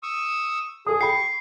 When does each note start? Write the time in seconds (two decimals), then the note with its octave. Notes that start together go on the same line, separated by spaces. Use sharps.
0.03 C#6 D#6 E6
0.86 G#4 A4 D#6
1.01 G5 B5 C#6 C7